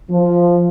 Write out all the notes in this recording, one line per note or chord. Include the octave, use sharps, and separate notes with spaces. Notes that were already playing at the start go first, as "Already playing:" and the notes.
F3